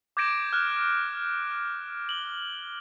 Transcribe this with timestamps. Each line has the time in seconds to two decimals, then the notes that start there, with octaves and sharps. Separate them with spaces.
0.17 D6 G6 G#6 A#6 D7 E7
0.53 F6 F#6
1.51 F#6
2.09 F#7 G7